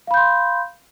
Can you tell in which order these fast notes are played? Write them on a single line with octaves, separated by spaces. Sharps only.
F5 B5 G6 C6